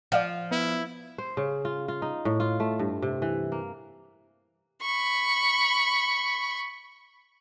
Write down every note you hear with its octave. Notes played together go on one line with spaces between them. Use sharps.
F3 D5 F5 F#5
B3 E4
C5
C#3
F4
F4
D#4
A2
F4
A3
G2
C3
E3
A#3
B5 C#6